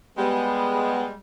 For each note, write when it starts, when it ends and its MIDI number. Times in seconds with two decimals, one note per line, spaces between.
0.18 1.16 55
0.18 1.16 56
0.18 1.04 59